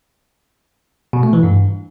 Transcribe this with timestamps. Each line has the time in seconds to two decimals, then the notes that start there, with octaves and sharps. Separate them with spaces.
1.13 B2
1.23 A3
1.33 E3
1.43 G2